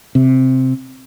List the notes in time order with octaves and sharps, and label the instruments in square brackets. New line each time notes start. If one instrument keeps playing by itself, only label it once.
[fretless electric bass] C3